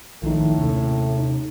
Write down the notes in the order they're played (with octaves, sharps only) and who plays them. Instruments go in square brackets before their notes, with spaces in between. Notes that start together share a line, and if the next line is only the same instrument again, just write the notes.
[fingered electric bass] B1 F3 [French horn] A2 [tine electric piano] D#3 D#4
[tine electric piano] D#2 [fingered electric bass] C3 C#4
[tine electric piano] D#4